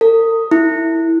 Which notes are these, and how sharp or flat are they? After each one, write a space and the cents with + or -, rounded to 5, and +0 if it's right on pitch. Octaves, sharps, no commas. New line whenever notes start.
A#4 -45
E4 -5